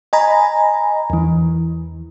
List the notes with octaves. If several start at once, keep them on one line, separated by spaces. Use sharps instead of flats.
D#5 G#5 A#5 B5
E2 E3